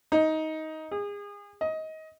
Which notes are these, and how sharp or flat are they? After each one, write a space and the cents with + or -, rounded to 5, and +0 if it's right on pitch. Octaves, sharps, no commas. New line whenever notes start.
D#4 +15
G#4 -30
D#5 +20